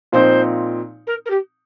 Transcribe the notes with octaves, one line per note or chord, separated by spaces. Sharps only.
A#2 F3 C4 D#4 C5
A#4
A#4
G4